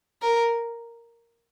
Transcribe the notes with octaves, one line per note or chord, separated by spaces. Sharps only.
A#4